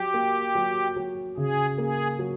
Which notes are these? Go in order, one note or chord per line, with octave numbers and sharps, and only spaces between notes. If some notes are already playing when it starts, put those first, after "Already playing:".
Already playing: F#3 G4
A#3
F#3
F#3
C#3 G#4
A#3 G#4
F#3